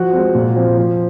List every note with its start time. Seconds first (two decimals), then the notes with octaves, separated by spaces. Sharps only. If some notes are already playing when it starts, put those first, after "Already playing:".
Already playing: F3 F#4
0.13 G#3 C4
0.34 A#2
0.55 F3 C4
0.77 F3